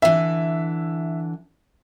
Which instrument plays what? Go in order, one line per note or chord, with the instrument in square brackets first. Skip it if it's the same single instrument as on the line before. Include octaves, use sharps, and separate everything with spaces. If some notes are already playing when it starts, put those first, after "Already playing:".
[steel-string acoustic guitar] D3 E3 [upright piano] E5